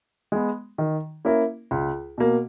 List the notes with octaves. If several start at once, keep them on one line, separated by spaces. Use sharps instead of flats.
G#3 B3
D#3
A#3 C#4 E4 A#4
C#2
B2 A#3